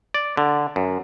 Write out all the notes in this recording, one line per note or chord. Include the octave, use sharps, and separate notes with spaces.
D5
D3
F#2